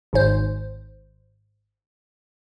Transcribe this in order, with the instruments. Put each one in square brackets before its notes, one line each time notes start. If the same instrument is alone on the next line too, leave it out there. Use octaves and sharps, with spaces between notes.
[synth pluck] G#1 G#2 C5